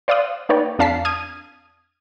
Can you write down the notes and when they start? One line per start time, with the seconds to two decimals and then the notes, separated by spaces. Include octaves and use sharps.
0.08 C5 D5 F5 C6 D#6 F#6
0.49 A#3 D#4 B4 C#5 D5 G5
0.79 F2 D4 F5 A5 B6 C7
1.05 D#6 F6 G#6 D#7